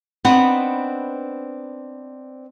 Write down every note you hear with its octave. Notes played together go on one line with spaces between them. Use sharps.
B3 C4 D4 D#4 B4 F#5